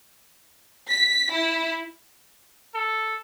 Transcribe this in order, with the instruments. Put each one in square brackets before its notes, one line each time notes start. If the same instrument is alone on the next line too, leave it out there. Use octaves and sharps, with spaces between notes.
[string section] B6
E4
[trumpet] A4